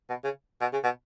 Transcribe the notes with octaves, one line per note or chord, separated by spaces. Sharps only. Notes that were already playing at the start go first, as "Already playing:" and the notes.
B2
C#3
B2
C#3
B2